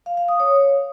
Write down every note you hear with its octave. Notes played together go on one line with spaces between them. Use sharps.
F5
F5
D#6
C#5